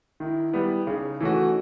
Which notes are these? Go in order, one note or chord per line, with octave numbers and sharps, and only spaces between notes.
D#3 E4
G3 B3
C#3 D#4
E3 A3 C#4 F#4